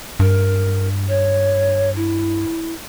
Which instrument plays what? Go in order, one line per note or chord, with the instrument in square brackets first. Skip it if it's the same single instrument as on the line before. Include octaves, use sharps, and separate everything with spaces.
[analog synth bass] G2 [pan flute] A#4
[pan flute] C#5
E4